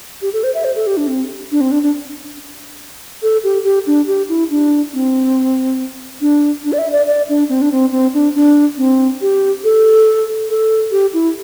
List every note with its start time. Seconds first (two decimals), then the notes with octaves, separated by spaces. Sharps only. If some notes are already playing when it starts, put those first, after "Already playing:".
0.22 G4
0.33 A4
0.44 C5
0.55 E5
0.65 C5
0.76 A4
0.87 G4
0.97 D4
1.07 C4
1.51 D4
1.61 C4
1.72 D4
1.83 D4
3.22 A4
3.44 G4
3.64 G4
3.87 D4
4.07 G4
4.29 E4
4.51 D4
4.94 C4
6.21 D4
6.64 D4
6.72 D5
6.78 E5
6.92 D5
7.07 D5
7.29 D4
7.49 C4
7.62 D4
7.72 C4
7.92 C4
8.14 D4
8.35 D4
8.78 C4
9.21 G4
9.64 A4
10.50 A4
10.91 G4
11.14 E4